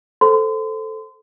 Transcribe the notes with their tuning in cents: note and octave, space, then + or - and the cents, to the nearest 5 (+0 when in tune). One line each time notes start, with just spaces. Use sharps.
A4 +0 C5 +0 C6 -35